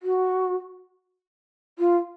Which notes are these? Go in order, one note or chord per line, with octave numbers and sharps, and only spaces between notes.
F#4
F4